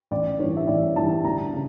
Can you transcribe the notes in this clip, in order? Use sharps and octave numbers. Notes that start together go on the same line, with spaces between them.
A1 D5
G2 E3 G3 C#5
E5
A1 D5
G2 E3 G3 A5
D2 A#5
C#3